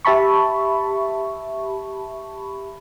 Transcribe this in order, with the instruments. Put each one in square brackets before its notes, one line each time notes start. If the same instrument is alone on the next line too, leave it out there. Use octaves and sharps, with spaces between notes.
[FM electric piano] G4 E5 A5 B5 C#6